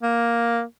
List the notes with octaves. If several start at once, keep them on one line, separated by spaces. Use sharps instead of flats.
A#3